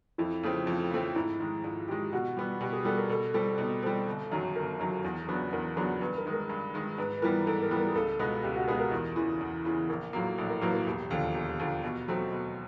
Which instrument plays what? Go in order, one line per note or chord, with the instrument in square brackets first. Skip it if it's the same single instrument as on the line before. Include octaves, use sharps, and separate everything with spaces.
[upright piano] F2 [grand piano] E4
[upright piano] C#3 F3 A3 C4
[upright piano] F2 [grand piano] F4
[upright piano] C#3 F3 A3 C4
[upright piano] G#2 [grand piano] E4
[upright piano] D#3 G#3
[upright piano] G#2 [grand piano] F4
[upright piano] D#3 G#3 [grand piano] G4
[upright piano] B2 [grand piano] F#4
[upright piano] G3 B3
[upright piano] B2 [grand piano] G4
[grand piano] G#4
[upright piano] G3 B3 [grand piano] A4
[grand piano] A#4
[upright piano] B2 [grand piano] A4
[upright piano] G3 C4 [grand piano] A4
[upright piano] B2 [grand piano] D#4
[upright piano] G3 C4 [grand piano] A4
[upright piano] G1
F#2 D#3 F#3
[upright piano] G1 [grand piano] A#4
[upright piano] F#2 D#3 F#3
E2
C#3 F#3 B3 D4
[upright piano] E2 [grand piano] A#4
[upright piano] C#3 F#3 B3 D4
[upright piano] G2 [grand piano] B4
[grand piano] A#4
[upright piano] D#3 G#3
[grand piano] A#4
[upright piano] G2
D#3 G#3
[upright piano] G#2 [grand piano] B4
[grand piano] B4
[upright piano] E3 G3 B3 [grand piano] A#4
[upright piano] G#2 [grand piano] A4
[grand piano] A#4
[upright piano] E3 G3 B3
[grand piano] A#4
G#4
[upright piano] C#2 [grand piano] A4
[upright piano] B2 G#3 B3 D#4
[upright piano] C#2 [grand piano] G4
[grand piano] F#4
[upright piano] B2 G#3 B3 D#4 [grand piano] G#4
[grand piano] A#4
[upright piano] E2
C#3 E3
E2
C#3 E3
[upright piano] A#1 [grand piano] A#4
[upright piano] A2 F#3 A#3
[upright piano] A#1 [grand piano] A4
[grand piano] A#4
[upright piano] A2 F#3 A#3 [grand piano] B4
[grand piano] A#4
[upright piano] E1 [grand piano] G4
[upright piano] D#2 D3 F3
[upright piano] E1 [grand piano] G4
[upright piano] D#2 D3 F3
B2
F#3 A3 C4 D#4
B2